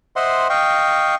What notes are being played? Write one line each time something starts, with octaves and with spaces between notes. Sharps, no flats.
C5 D#5 E5 F#5 C6
D#5 F5 G5 C#6